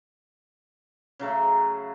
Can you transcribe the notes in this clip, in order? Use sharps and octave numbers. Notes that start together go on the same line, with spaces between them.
C#3 F#3 A3